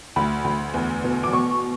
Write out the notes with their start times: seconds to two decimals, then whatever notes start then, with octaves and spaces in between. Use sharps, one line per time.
0.16 D2 B5
0.44 D2
0.74 E2
1.04 B2
1.23 D6
1.32 B2 C#6